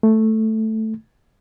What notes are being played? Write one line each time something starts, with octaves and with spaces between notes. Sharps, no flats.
A3